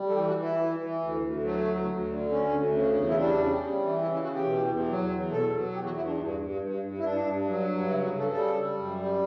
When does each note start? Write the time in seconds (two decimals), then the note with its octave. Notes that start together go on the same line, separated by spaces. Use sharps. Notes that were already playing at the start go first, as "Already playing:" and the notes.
Already playing: G3
0.08 A4
0.14 E3 G4
0.28 F#4
0.35 E3
0.42 E4
0.57 E3
0.78 E3
1.00 D2
1.22 D2
1.43 F#3 A3
1.65 D2
1.86 D2
2.07 D3
2.29 D2 C#4
2.51 D2
2.72 C#3
2.94 E2
3.08 E4
3.16 G3 D4
3.37 C#3
3.58 G3
3.80 E3
4.02 C#3 E4
4.13 E4
4.23 E2 F#4
4.34 G4
4.44 B2
4.67 E2
4.88 F#3
5.10 E2
5.31 B2 A4
5.53 F#3
5.74 E2 G4
5.85 F#4
5.96 E2 E4
6.06 D4
6.17 G2
6.40 G2
6.61 G2
6.83 G2
6.98 E4
7.03 G2 D4
7.25 G2
7.47 F#3
7.68 G2
7.89 C#3 E4
8.04 F#4
8.11 C#3
8.19 A4
8.33 G3 A4
8.55 G3
8.77 F#2
8.98 G3